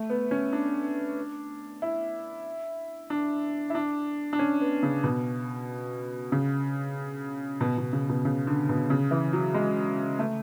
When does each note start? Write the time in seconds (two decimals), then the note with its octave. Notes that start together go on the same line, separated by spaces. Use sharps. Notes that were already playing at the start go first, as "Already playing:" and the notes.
Already playing: A3
0.10 B3
0.31 C#4
0.53 D4
1.82 E4
3.10 D4
3.70 E4
3.75 D4
4.33 D4
4.39 C#4
4.61 B3
4.83 C#3
5.04 B2
6.32 C#3
7.61 B2
7.78 B2
7.93 C#3
8.09 B2
8.25 C#3
8.47 D3
8.69 B2
8.90 C#3
9.11 E3
9.33 F#3
9.54 G#3
10.19 A3